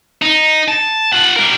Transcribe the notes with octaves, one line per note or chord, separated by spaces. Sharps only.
D#4
A5
F4 F#5
G3 A#4